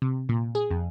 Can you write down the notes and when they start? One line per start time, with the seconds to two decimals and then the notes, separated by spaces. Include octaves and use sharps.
0.02 C3
0.29 A#2
0.55 G#4
0.71 F2